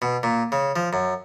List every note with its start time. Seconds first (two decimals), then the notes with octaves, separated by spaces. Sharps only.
0.02 B2
0.23 A#2
0.52 C#3
0.76 F3
0.93 F#2